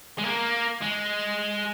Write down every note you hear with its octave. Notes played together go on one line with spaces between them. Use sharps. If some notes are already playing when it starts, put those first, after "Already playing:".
G#3
A#3
G#3